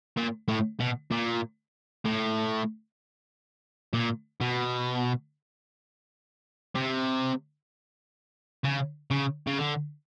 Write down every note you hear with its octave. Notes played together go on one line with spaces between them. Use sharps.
A#2
A2
B2
A#2
A2
A#2
B2
C3
C#3
C#3
C#3
D3